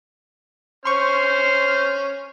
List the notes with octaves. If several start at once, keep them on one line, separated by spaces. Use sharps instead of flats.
C#4 C5 C6 C#6 F6